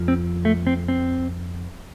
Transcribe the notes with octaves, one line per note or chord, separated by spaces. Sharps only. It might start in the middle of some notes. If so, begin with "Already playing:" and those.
Already playing: F2 F3
C4
A3
C4
C4